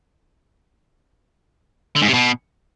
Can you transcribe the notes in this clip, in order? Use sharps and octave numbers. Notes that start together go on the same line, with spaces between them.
D3
G#2
C3
B2